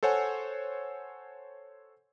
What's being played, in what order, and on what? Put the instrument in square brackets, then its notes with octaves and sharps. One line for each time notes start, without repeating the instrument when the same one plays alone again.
[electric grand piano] A4 C5 C#5 F#5 G#5